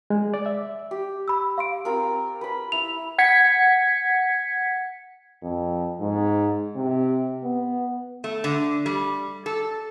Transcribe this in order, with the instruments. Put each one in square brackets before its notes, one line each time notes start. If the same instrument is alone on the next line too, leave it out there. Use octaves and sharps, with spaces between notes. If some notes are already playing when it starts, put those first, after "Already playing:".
[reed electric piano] G#3
D5
E5
[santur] G4
[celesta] B5 E6
F5 C6 D7
[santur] C4 F4 A#4
B4 B5
[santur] E4 [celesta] F7
[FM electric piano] F#5 G#6 B6 C#7
[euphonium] F2
G#2
C3
B3
[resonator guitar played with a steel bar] A3
D3
G3
A4